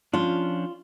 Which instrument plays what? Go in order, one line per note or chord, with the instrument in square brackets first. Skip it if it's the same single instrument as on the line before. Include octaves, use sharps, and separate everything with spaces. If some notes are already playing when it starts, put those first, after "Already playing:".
[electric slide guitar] F3 C#4 D4 [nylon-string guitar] F4